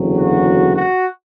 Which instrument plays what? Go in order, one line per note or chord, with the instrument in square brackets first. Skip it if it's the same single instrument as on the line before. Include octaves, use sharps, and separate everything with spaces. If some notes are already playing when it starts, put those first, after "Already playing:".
Already playing: [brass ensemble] F#1 E2 D3 F#3
F#4
F#4